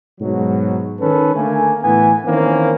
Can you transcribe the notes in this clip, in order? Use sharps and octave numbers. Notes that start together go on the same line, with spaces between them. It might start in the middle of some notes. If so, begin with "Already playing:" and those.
G#2 B2 F#3
D#3 C#4 A4 B4
D3 A3 A#3 G#5
A2 E3 B3 G#5
D#3 E3 A#3 C4 C#4